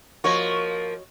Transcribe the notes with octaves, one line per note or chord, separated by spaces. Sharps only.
F3 A#3 F#4 C#5 D#5